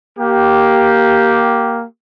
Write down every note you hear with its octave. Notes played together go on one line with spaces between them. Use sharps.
A#3 G4